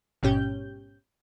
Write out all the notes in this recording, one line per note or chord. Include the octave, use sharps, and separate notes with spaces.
A1 G#2 B2 C#4 G4 G6